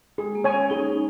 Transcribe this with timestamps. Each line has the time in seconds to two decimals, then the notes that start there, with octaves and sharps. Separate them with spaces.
0.18 G#3 G#4
0.35 A#3
0.44 C#5 G#5 C#6
0.52 C#4
0.70 D#4 G#4